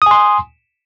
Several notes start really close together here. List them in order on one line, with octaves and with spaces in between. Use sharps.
D#6 G#5 C6